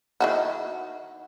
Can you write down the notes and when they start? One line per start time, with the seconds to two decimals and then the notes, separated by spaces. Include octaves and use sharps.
0.20 D#3 E4 F#4